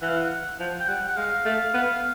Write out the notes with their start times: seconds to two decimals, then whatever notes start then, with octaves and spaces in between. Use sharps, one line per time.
0.02 E3 F#5
0.09 F5
0.16 F#5
0.59 F3
0.80 G5
0.88 G3 F#5
1.09 F#5
1.17 G#3 F5
1.45 A3
1.74 B3